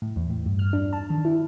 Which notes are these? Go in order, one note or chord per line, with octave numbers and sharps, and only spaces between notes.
A2
E2
A2
G2
F6
D4
A5
D#3
E4